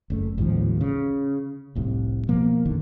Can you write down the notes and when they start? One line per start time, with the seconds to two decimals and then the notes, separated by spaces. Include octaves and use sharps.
0.10 F#1 F#2 A3
0.38 A1 D#2 G#2 F3
0.81 C#3
1.75 F1 C2 A2 C3
2.28 B2 F3 A#3
2.66 F#1 B1 D3 D#3